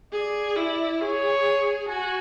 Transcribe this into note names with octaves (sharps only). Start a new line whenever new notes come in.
G#4 D5
E4
G#4 C#5
F#4 G#5